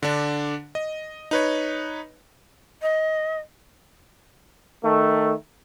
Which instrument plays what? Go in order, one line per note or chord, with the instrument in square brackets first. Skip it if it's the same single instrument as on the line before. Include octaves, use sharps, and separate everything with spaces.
[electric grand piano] D3 D4
D#5
D#4 B4 C#5
[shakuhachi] D#5
[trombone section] D#3 A3